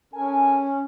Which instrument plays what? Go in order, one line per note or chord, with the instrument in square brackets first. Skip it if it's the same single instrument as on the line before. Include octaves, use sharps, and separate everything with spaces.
[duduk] C#4 [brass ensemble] A4 A#4 G#5